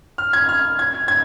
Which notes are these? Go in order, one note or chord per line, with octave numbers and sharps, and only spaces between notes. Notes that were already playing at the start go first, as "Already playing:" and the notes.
F6
G#6
F6
G#6
G#6